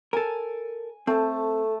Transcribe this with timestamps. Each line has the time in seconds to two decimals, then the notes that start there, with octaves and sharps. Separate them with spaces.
0.13 A4 A#4 G#5
1.07 A3 C4 A4 A5